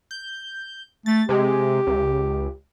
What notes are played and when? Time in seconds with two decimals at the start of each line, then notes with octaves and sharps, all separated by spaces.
0.11 G6
1.06 A3 A6
1.29 C3 G#3 G4
1.87 C#2